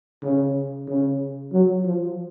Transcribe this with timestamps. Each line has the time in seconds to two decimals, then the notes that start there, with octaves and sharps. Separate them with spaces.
0.23 C#3
0.88 C#3
1.53 F#3
1.85 F3